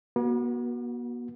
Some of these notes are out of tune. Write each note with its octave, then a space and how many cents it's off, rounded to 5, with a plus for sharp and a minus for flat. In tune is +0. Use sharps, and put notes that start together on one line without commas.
B3 -45 F#4 +0